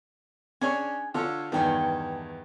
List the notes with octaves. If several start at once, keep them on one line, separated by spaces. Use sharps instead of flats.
C#4 D4 G#4 C#5 G#5
D3 F4 A4 C#5
E2 G2 D#3 A4 G5 G#5